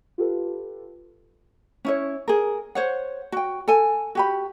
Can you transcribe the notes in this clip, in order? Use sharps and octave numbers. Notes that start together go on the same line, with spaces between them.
F4 G4 A4 B4
C#4 E4 C#5
G#4 A#4
C5 C#5 F#5
F#4 G5
A4 G#5
F#4 G4 B5